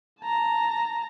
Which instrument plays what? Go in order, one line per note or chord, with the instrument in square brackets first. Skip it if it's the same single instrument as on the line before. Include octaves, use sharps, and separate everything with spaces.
[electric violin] A5 A#5